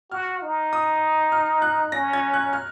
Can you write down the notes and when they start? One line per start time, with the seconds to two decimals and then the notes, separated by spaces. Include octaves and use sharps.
0.11 F#4 F6
0.42 D#4
0.73 D#6
1.32 F6
1.62 F#6
1.92 C#4 A#6
2.13 G#6
2.33 F#6
2.53 F6